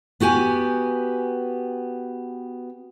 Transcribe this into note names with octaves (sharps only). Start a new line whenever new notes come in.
B3 F#4 G4 G#5